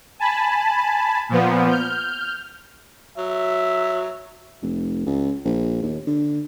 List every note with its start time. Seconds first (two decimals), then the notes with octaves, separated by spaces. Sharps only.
0.19 G#5 A5 B5
1.29 A#2 F3 B3
1.69 F6 G6
3.18 F#3 E5
4.62 F1
5.06 C#2
5.45 A#1
5.82 D#2
6.07 D3